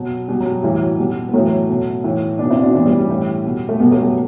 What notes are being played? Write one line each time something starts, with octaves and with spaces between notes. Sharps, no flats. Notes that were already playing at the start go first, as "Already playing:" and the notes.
Already playing: B2 F#3
B2 G3
F#3
G3
A2 E3 G3
F#3
B2 G3
B3
A2 E3 F#3 A3
B2
A2 E3
B2 B3 D4
C4 E4
D4 F#4
A2 E3 B3 D4
G3 B3
G3
A2 E3
B2
A3
B2 G3 B3
F#3 A3
G3